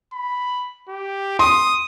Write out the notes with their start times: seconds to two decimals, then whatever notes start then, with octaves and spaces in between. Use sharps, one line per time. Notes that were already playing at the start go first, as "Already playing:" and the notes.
0.13 B5
0.89 G4
1.39 C6 D#6